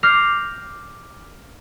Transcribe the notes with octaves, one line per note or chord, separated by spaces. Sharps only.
D6 F6 G6 A#6 C7